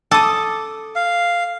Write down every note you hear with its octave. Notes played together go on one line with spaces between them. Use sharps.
A4 D6 D#6
F5